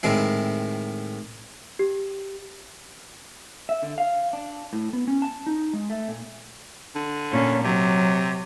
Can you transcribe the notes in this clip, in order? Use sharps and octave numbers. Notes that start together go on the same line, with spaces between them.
A2 D#3 G#3 C4 E4
G4
E5
D3
F5
D4
A2
B3
C#4
A5
D#4
G#3
A3
A#2
D3
A#2 C#4
C3 F#3